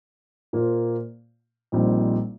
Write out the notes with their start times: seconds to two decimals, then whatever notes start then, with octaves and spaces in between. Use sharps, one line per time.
0.53 A#2 A#3 F4 C5
1.72 A#1 A#2 G3 C4 D#4